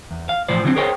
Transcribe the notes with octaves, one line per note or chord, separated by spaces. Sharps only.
E2
F5
B1 A2 E3 F3 C5 D5
D3 E3 F#3 G#3 C4
G#4 A#4 C5 C#5 D#5 G5